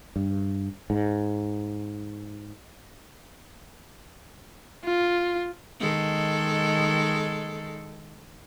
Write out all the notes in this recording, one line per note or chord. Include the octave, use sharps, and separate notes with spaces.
G2
G#2
F4
D#3 G#3 A4